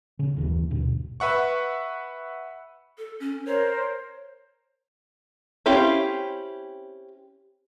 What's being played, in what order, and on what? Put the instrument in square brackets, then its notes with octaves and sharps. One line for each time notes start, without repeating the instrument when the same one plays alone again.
[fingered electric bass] C#3 C#4
F#1 D#2 C#3 E3
D2 G2 B2
[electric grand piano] B4 E5 F#5 C#6
[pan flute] A4
C#4
[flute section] A#4 C5 [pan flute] C#5
[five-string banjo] C4 C#4 E4 G4 F5